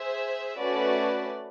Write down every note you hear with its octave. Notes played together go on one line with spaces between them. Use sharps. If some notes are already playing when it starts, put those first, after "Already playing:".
Already playing: G#4 C5 E5
A3 C#4 F#4 B4 D5